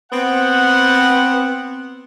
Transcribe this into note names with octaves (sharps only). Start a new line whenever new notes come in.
B3 C4 F#5